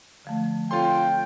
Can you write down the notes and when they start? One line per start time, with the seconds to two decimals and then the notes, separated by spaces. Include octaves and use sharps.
0.25 D3 F3 A3
0.71 C4 F4 A4 C#5 G5 C6